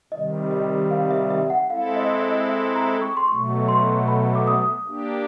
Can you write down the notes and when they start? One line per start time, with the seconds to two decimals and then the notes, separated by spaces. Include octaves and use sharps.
0.12 C3 D#3 G3 D#5
0.51 D#5
0.91 F5
1.11 E5
1.30 E5
1.50 F#5
1.70 G#3 C4 E4 A4 F5
1.96 D#5
2.22 D#5
2.49 E5
2.75 A#5
3.01 C#6
3.17 C6
3.28 B2 F#3 A3 C#6
3.69 C6
4.08 B5
4.35 D6
4.47 D#6
4.87 A#3 D4 G4